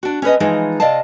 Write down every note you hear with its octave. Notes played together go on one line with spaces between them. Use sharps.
D4 F#4
C#4 G#4 B4 D#5
E3 F3 G#3 D#4 F4 G#4
C3 D5 D#5 F5 A5